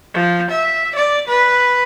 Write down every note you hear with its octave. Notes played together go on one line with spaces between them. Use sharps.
F3
E5
D5
B4